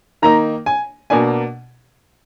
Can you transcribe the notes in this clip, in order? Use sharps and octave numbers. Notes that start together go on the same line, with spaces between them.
D#3 A#3 D#4 A#5
G#5
B2 A#3 D4 G#5